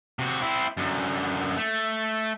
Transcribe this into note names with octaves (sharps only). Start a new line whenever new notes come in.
C3 F#4
C4 E4
F#2 D3
A3